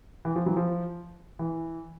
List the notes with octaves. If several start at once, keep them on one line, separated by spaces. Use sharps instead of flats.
E3
F3
E3 F#3
F3
E3